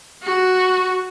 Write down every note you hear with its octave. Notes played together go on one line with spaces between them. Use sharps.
F#4